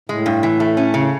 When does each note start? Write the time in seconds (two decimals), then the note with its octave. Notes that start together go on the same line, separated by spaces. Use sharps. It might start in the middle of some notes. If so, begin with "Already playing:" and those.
0.09 A2 G#3
0.26 G2
0.43 E3
0.60 A3
0.77 C#4
0.94 C#3